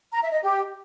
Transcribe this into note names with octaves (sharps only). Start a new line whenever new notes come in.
A#5
E5
D#5
G4